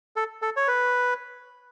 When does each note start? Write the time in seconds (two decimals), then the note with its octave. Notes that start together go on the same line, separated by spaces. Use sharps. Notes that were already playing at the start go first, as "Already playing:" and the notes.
0.16 A4
0.42 A4
0.57 C#5
0.68 B4